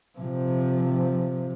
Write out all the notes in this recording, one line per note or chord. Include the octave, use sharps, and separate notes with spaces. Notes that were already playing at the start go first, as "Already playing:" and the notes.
C3 F3